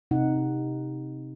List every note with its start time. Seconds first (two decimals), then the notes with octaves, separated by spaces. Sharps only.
0.11 C3 D#4 F#5